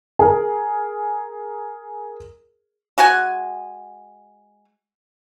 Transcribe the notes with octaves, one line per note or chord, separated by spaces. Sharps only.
G#4 A#4
G#3 F#4 F#5 G#5